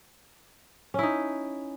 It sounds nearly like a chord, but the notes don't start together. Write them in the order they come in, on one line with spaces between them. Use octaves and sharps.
C#4 E4 D#4